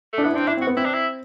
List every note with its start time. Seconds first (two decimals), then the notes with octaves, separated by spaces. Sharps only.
0.13 A3
0.18 D4
0.24 B3 E4
0.34 C4 D4
0.47 D4 E4
0.57 C4
0.61 F#4
0.67 B3
0.77 C4 E4
0.85 D4
0.94 E4